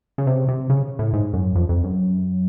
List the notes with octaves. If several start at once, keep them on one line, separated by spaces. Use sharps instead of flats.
C#3
C3
C3
C#3
A2
G#2
F#2
F2
F2
F#2